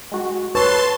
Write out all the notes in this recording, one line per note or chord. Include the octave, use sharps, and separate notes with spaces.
G#3 F#4
A4 B4 C#5 A5 C6